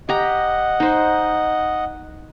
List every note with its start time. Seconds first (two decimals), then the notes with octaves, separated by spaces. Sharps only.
0.09 G4 D#5 F#5 A#5
0.80 D#4 C5